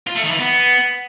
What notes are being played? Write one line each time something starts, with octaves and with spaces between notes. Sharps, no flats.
F4
A3
D#3
E3
B3